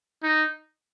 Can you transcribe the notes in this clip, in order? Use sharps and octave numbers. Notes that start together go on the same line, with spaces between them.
D#4